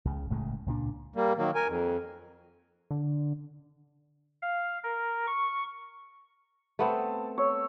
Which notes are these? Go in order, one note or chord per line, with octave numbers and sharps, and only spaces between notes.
C#2 C#3
E1 A2 C#3 G#3
C#2 A#2 G#3 D4
G3 A#3
D#3 F#3 A#3
A#4 G#5
F2
D3
F5
A#4
C#6
A3 B3 C4 A5
C#5 E6